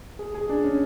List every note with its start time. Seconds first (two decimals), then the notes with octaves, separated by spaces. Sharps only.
0.19 G#4
0.34 G#4
0.49 D4
0.64 C#4